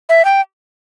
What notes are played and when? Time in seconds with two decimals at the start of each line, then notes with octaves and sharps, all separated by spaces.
0.09 E5
0.25 G5